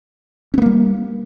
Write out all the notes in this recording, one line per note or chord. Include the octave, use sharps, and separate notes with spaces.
G3 A#3 B3 C#4